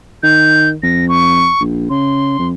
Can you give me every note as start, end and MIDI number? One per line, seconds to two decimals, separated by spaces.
0.23 0.74 51
0.23 0.68 91
0.83 1.50 41
0.83 1.08 94
1.09 1.62 85
1.60 1.86 34
1.90 2.36 49
1.90 2.48 84
2.39 2.54 41